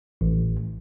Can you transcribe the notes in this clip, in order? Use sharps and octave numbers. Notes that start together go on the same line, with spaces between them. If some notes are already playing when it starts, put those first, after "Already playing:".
A1